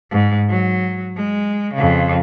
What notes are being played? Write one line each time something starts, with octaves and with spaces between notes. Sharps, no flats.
G#2
F#3
G#3
F2 C#3